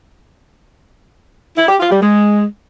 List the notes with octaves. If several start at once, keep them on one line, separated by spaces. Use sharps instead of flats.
E4
G4
F4
G3
G#3